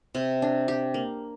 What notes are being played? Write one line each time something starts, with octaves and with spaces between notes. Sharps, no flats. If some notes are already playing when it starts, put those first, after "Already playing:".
C3
D4
G4
A#3